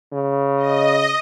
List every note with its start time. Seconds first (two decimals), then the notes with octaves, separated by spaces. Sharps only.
0.12 C#3
0.57 D#5